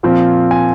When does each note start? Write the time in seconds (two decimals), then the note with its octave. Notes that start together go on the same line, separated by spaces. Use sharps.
0.03 A#2 F3 C4
0.51 G#5